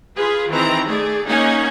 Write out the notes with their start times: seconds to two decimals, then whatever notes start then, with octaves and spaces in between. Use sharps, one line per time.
0.17 F4 G#4 B4
0.51 D#3 E3 C4 A#5
0.88 A3 G#4 D5
1.28 A#3 C#4 D#4 F#5 G#5